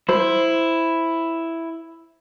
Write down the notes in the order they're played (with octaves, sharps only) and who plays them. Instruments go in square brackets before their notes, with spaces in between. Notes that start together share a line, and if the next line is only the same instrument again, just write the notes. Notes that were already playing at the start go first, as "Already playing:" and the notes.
[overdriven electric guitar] E4 [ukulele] C5